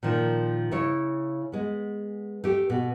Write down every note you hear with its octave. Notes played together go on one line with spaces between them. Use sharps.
A#2 D#3 F3
C#3 E4 C#5
G#3 B3
A3 G4
B2